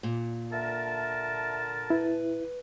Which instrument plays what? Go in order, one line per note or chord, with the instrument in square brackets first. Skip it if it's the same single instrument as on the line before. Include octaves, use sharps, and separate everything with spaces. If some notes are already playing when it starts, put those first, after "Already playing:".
[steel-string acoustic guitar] A#2
[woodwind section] D3 A#4 A5 [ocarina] E5
[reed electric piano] E4 [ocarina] B4